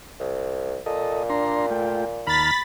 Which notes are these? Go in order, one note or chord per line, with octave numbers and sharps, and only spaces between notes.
C2
A#2 A4 D#5
D4 A#5 C6
A3 F4 G5
D#2 A#5 B5 F6 A6 B6